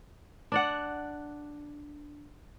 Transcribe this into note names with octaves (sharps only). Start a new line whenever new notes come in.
D4 D5 F#5